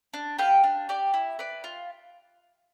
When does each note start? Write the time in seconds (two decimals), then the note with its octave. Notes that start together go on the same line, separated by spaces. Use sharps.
0.14 D4
0.38 G4 B4 F5
0.64 D4
0.89 G4 D5
1.14 E4
1.39 B4 D5
1.64 F4